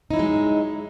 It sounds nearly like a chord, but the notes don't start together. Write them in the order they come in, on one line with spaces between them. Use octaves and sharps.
D#4 E4 F#3 G#3